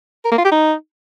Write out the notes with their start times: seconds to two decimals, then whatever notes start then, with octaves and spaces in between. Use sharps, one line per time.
0.25 A#4
0.31 A#3
0.38 F4
0.45 G4
0.51 D#4